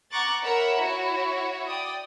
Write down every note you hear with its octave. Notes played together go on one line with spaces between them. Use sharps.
F#5 A#5 C#6 D6 F#6 A6
A#4 C#5 E5 F#5 A#5 B5
E4 F#4 C#5
D5 G5 D#6